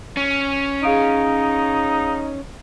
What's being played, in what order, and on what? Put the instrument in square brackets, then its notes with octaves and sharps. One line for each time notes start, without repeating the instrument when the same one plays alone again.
[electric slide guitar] C#4
[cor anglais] D#4 [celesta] G#4 F5 D7